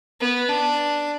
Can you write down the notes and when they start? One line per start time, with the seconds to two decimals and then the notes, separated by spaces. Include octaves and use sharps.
0.20 B3
0.49 D4